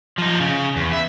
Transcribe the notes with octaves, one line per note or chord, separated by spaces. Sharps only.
F3 D#4
C#3
E2
E5